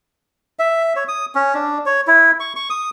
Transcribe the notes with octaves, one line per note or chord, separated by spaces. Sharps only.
E5
C#5
D#6
C#4
D4
C#5
E4
C#6
C#6
D#6